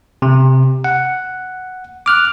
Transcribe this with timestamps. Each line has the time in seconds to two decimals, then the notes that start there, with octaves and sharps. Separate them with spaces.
0.22 C3
0.84 F#5
2.06 D6 F6 F#6